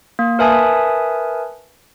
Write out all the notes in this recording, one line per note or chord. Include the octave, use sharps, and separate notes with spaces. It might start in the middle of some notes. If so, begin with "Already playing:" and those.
A#3
A#4 B4 E5 G#5 A5 D#6